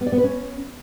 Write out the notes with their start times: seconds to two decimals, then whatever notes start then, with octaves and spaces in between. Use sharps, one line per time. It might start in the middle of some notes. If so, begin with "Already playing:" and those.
0.01 B3
0.07 D5
0.12 B3
0.18 B4
0.24 C#4